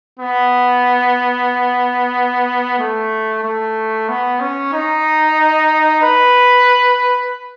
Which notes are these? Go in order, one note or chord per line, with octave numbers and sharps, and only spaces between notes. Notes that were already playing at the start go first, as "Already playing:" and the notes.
B3
A3
A3
B3
C#4
D#4
B4